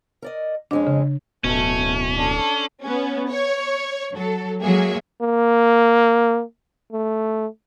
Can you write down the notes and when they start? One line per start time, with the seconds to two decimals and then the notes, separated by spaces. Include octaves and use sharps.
0.22 A#4 D5 D#5
0.71 F2 G#3 C#4 D4
0.87 C#3
1.44 D1 B2 A3 C#4
2.14 D4 A4
2.83 B3 C#4
3.30 C#5
4.15 F#3 A4
4.62 F#3 G#3 A#3 G#4 E5
5.22 A#3
6.92 A3